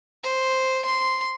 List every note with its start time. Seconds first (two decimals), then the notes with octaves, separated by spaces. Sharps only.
0.23 C5
0.85 C6